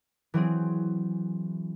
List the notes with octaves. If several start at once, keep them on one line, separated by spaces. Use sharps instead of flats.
E3 F#3 C4 G#4